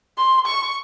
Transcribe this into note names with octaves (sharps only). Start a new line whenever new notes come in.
C6
C#6